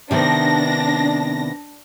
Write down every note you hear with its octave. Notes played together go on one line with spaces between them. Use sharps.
C3 D#3 B3 D4 A#6